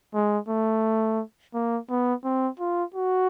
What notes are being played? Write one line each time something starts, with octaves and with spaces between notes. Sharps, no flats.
G#3
A3
A#3
B3
C4
F4
F#4